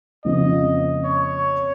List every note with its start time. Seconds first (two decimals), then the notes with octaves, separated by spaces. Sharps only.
0.24 F2 C#3 F3 A#3 F4 D#5
1.04 C#5